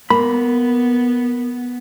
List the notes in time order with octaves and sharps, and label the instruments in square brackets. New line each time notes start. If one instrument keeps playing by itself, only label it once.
[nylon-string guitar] A#3 [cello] B3 [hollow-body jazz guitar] B5